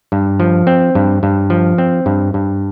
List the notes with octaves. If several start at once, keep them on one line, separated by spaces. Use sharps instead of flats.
G2
F3
C4
G2
G2
F3
C4
G2
G2